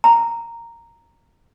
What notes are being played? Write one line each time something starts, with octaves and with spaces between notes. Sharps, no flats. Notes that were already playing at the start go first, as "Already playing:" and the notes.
A#5